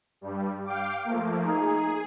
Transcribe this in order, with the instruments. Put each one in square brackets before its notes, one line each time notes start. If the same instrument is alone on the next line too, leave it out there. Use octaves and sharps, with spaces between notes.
[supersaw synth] G2 G3
F5 G5 D6
F3 A3 A#3
[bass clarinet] D#4 [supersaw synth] G#4